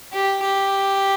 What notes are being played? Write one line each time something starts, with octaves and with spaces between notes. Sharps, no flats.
G4
G4